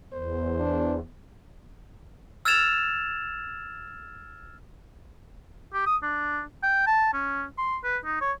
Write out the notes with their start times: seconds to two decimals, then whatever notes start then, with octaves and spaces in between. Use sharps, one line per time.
0.13 E2 C5
0.60 D4
2.45 E6 F6 G#6 A6 E7 F7
5.73 G4
5.86 D#6
6.03 D4
6.63 G5
6.87 A5
7.13 C#4
7.58 C6
7.83 B4
8.05 D#4
8.21 C#5